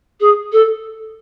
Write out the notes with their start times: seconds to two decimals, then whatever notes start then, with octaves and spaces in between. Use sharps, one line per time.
0.20 G#4
0.52 A4